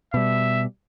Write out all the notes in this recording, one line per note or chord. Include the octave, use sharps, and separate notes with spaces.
B2 G3 E5